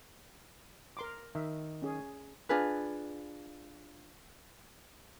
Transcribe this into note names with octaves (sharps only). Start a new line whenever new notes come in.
A#4 C6 D6
D#3 E5
C#4 G#4
D4 F4 G#4 B4